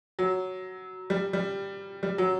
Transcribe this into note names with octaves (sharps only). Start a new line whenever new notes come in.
F#3
G3
G3
G3
F#3